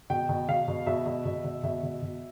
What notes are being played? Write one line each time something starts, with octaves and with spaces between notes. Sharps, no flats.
B2 G5
B2
B2 F5
B2
B2 E5
B2
B2
B2
B2 E5
B2
B2